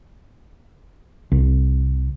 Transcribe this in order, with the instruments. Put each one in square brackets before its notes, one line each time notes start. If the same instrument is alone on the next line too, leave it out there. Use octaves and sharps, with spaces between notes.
[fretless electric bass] C2